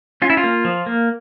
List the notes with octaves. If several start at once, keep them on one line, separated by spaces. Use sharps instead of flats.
C#4 F4
E4
F4
A#3
F3
A#3